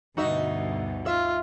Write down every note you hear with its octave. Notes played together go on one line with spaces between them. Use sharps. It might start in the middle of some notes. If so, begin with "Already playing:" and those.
D2 G2 B2 D#4 F#4 E5
F4 E5